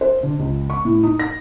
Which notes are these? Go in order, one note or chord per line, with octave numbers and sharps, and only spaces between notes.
C5
D3
C#2
C#6
A2
D#4
A#6